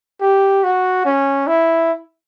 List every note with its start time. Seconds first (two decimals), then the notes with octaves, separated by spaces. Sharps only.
0.21 G4
0.63 F#4
1.05 C#4
1.47 E4